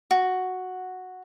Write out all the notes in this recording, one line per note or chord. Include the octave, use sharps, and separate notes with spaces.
F#4